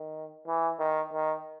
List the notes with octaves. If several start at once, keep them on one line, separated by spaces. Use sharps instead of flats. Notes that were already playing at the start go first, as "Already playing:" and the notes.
Already playing: D#3
E3
D#3
D#3